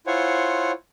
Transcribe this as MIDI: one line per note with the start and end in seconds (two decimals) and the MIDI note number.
0.07 0.72 64
0.07 0.72 65
0.07 0.72 72
0.07 0.72 73
0.07 0.72 78
0.07 0.72 80